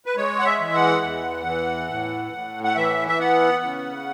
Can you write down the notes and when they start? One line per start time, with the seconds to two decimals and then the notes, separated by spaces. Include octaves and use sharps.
0.06 B4
0.17 G#3 C#5
0.39 F#5
0.45 E5
0.60 E3
0.74 F#5
1.02 E2
1.46 E3
1.90 A2
2.33 A2
2.64 F#5
2.76 E3 E5
3.08 E5
3.19 B3 F#5
3.63 C#3